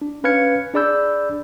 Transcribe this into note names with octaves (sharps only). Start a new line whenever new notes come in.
D4
C#4 B4 F5 F6 G#6 C#7
D4 G#4 D5 B5 E6 G6